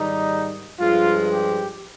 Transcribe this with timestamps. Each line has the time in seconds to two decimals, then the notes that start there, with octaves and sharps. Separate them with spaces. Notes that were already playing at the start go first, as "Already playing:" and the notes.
Already playing: G#2 D#3 G3 D#4
0.79 G2 F3 G#3 F4
1.32 G4